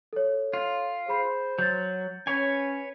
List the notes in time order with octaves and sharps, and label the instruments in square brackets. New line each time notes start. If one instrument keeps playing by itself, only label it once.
[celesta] A4 C#5
[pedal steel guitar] F4
[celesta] G#4 B5 C7 [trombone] C5
[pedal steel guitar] F#3 [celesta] G6 A6
[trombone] C#4 [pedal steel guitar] B4 C#5 G#5